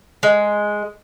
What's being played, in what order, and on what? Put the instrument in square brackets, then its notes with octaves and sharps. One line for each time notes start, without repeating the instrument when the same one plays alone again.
[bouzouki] G#3